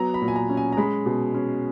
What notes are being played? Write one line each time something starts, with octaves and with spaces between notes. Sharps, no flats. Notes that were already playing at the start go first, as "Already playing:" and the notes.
Already playing: F#3 B3 A#5
B5
A#2
G#5
A#5
C#4
G#5
A#5
G#3 B5
B2
C#4